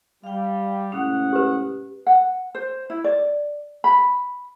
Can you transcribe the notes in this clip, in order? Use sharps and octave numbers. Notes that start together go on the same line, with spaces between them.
G3 F5 G5
A2 C3 G#3 C#4 F#5 D#6
G4 B4
F#5
C5
E4
D5
B5